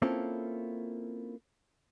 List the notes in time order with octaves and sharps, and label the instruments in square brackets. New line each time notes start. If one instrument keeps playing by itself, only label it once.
[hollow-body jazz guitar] A#3 C4 C#4 E4 F4 A4